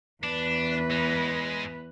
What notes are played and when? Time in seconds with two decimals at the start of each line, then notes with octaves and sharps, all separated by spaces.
0.24 E2 D4 B4
0.91 G#3 D#4